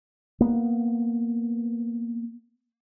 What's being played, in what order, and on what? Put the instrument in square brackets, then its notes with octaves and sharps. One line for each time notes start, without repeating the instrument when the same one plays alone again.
[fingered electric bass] A#3 B3